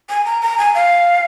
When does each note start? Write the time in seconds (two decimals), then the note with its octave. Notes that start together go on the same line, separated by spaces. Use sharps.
0.09 G#5
0.26 A#5
0.42 A#5
0.58 G#5
0.75 F5